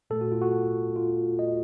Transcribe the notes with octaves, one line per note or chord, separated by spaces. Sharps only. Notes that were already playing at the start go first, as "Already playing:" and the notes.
A#2 A3 A4
F#4
F4
F#4
F4
D#5